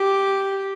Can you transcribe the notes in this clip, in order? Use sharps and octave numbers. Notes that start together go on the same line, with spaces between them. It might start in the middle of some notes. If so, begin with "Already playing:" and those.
Already playing: G4